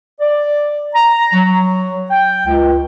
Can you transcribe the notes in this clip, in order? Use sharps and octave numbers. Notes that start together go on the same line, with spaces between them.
D5
A#5
F#3
G5
C#2